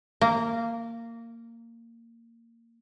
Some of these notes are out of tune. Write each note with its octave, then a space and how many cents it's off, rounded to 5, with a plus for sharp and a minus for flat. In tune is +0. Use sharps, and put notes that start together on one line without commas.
A#3 -15